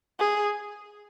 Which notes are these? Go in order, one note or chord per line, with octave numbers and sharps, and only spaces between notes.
G#4